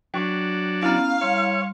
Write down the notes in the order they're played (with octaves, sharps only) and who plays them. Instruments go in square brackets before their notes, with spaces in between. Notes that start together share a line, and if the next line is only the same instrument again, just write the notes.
[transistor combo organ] F#3 D4 [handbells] G5 C#6
[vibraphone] B3 C#4 [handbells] E4 A#5 [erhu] F5
[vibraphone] G3 C6 [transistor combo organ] C#5